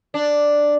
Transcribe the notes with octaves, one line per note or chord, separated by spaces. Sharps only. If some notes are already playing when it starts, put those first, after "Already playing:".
D4